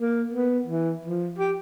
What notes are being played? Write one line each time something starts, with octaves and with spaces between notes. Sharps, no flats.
A#3
B3
E3
F3
G4